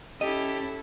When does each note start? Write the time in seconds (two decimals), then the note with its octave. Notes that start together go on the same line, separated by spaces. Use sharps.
0.21 C#4 E4 G4 A4 D#5